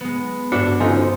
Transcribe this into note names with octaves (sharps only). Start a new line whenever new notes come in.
G#3 B3
G2 D4 F#4 E5 C#7
D3 F3 C#4 D#4 F#4 G#5
C5